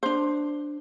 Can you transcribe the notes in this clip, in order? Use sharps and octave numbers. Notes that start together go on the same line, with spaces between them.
D4 C5